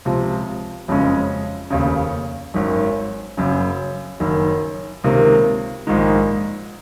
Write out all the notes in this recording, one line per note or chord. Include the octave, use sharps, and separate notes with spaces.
C#2 C3 F3
F#1 F2 C#3 G#3 C#4
F1 D#2 C#3
G#1 F#2 D#3
F#1 F#2 C#3
F#1 F#2 D#3
C#2 C3 D#3 A#3
A#1 G#2 D#3 G#3 D#4